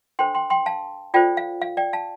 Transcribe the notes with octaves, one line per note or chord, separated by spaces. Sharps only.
D4 A4 C5 G5 C6
G5 C6
G5 C6
F5 A5
F4 A4 C5 D5 G5
F5
F5
D5 G5
F5 A5